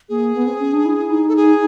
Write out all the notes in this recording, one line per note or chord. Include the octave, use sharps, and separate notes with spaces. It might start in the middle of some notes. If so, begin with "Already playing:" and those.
A#3 G#4
B3
C4
C#4
D4
E4
D#4
A4
G#4